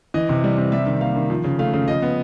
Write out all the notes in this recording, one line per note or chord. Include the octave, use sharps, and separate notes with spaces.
E3 D#5
C3
G3
C3
G3 E5
D#3
A#3 F5
D#3
F3
C#3
A3 F5
C#3
F3 D#5
B3